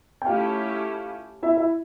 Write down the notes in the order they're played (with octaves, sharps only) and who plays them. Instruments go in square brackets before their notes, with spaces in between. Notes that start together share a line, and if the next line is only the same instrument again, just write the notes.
[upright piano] G5
[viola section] A3 C#4 E4 G4 [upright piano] F4 F5
[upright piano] E4 E5
E4 E5